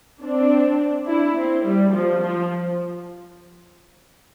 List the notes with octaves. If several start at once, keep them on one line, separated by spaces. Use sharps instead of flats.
C4 D4
D4 E4
C4
G3
F3
F3